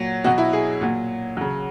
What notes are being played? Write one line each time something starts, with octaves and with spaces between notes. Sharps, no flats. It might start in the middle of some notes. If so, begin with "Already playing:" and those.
Already playing: A#2 F#3
B2 F#3 F#4
E4
G#4
A#2 F#3
C#3 F#3